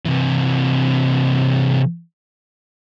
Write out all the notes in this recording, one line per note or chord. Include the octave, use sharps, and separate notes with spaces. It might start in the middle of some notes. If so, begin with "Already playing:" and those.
C3 E3